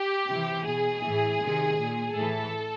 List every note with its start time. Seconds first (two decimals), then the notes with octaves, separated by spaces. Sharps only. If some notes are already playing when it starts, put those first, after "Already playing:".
Already playing: G4
0.28 C3 E3
0.64 B2 G#4
1.02 A2 E3
1.39 C3 D#3
1.77 A#2
2.14 A2 E3 A4